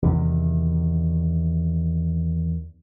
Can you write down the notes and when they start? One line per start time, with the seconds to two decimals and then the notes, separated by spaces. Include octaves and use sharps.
0.02 E2 C3 D#3